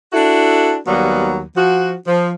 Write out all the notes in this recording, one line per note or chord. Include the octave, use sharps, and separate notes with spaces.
D4 E4 F#4 A4
D#2 F#3 G3 A#3 B3
F3 F#4
F3